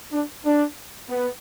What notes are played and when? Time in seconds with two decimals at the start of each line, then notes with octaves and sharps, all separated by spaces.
0.13 D4
0.44 D4
1.09 B3